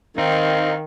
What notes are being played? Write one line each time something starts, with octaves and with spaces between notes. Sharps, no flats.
D#3 C4 D#4 F5